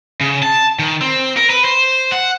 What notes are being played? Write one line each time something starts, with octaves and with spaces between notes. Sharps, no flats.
C#3
A5
D#3
C4
A#4
B4
C5
F#5